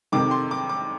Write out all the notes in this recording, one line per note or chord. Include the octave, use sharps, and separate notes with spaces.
F2 C3 D#3 D6
C6
D6
D6